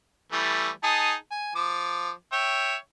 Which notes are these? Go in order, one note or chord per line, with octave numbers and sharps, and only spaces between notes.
E3 G3 A3
D#4 G#4 A5
G#5
F3 D6
C#5 E5 G5